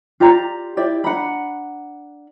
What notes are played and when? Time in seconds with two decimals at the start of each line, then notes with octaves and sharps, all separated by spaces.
0.20 F4 G4 D5 A#5
0.77 E4 G4 D5 E5
1.04 D4 F#5 A#5 B5